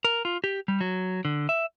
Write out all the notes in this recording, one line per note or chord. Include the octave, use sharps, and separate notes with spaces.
A#4
F4
G4
G3
F#3
D3
E5